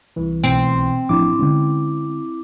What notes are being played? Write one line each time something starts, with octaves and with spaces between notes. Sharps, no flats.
C2 E3
B1 C4
A1 F3 D4 E4 D6
D3 G#3 C#4